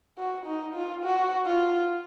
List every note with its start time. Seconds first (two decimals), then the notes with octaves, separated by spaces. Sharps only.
0.18 F#4
0.46 D#4
0.74 F4
1.03 F#4
1.46 F4